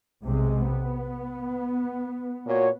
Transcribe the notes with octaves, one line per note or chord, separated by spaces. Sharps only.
B1 C3 G#3
B3
A#2 F#4 C#5